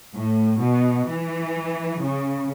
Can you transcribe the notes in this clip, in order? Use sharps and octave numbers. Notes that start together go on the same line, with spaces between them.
A2
B2
E3
C#3